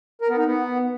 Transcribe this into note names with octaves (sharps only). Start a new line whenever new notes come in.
A#4
B3
D#4
B3